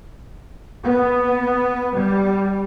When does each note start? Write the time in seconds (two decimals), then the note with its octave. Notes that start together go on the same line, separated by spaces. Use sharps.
0.83 B3
1.97 G3